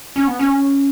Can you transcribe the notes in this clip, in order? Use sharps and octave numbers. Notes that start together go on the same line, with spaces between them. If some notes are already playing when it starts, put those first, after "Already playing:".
C#4
B3
C#4